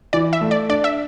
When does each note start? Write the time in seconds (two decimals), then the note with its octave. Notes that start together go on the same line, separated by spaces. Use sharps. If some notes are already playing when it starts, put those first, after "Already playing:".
0.13 E3 D5
0.33 E5
0.41 A3
0.51 D5
0.69 D4 D5
0.84 E5